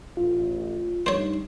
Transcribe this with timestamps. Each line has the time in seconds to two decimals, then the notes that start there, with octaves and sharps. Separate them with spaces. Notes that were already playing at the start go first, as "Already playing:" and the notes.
0.17 A1 F4
1.06 G2 D#4 C5 C#5